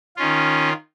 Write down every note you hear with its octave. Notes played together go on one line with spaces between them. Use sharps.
D#3 C#4 F4